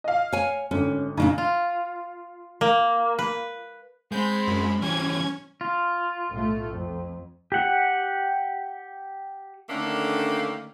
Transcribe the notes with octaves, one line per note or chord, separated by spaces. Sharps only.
D#5 F5
C#5 G#5
G#1 D3 C#4
A#2 C#3 D4 D#4
F4
A#3
B4
G#3 C4 B5 G6
F#2
E3 G3 C#4 G#6
F4
B1 A2 A3
F2
G4 F#5
D3 D#3 A3 A#3 C#4 D4